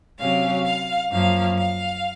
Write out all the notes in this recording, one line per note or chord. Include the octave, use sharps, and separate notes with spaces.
C3 F#3 C#4 F5
F5
F#2 F3 A#3 F5
F5